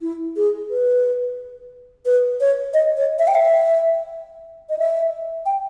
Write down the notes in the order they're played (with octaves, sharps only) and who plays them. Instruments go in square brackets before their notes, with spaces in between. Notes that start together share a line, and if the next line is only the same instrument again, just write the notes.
[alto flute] E4
G#4
B4
B4
C#5
D#5
C#5
E5
G5
E5
D#5
E5
G5